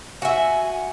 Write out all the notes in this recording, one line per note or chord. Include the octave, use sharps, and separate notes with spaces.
F#4 E5 G#5